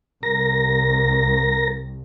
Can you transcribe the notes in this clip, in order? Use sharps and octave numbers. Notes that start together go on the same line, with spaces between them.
C2 A#4 A#6